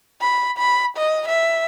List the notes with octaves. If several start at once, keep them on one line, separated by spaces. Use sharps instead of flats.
B5
B5
D#5
E5